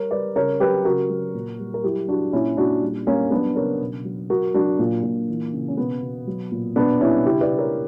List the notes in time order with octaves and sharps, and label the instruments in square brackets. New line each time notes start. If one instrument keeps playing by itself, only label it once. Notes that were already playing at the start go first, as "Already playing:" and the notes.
Already playing: [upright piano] G3 A#4 C#5
G3 B4 D5
C#3 A#4 C#5
F#3 G4 B4
C#3 F#4 A#4
F#3
A#2
G3
A#4
F#3 E4 G4
F#3 D4 F#4
A#2 C#4 E4
A#2 D4 F#4
G3
G3 A#3 C#4
F#3 B3 D4
C#3 A#4 C#5
B2
F#3
F#3 F#4 A#4
F#3 D4 F#4
A#2
A#2
E3
C#3
C#4
B2 B3
B2
F#3
A#2
B2 B3 D4
G3 C#4 E4
C#3 E4 G4
B4 D5
C#3
A#4 C#5